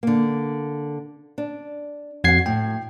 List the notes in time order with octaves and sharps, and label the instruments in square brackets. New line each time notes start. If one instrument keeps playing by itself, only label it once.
[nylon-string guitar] D3 A#3
D4
[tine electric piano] F2 G#6 C7 [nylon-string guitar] F#4 F#5
[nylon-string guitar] A2 [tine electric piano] G5